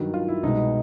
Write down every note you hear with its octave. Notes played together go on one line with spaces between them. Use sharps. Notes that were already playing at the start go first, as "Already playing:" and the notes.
Already playing: G2 D#3 F#3
F4
E4
C2 B2 G#3 B3 D#4